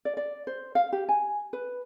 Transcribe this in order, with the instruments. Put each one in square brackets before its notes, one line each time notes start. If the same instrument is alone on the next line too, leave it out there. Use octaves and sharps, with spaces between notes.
[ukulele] D5
D5
C5
F5
G4
G#5
B4